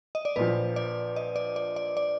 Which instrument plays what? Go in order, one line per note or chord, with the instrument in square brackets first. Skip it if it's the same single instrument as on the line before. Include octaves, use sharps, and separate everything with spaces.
[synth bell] D#5
D5
[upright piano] A#1 A#2 F3 [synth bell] B4
[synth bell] D5
D#5
D5
D5
D5
D5